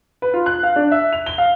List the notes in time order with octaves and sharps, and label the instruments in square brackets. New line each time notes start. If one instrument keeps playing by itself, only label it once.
[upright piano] B4
F4
F#6
F5
D4
E5
F7
G7
F5